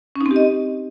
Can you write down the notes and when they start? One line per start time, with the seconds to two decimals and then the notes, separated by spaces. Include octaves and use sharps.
0.16 C#4
0.21 D#4
0.26 C4
0.31 G4
0.36 D#5